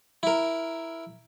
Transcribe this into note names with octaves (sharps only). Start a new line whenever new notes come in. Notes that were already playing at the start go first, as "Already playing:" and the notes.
E4 A#4